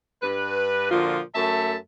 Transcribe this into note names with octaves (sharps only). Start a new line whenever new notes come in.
G2 B4
A#2 D3 F3 F4 F#4
F#2 A3 E5 A5